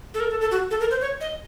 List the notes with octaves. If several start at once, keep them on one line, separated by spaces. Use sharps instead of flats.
A4
A#4
A4
A4
F#4
A4
A#4
C5
C#5
D#5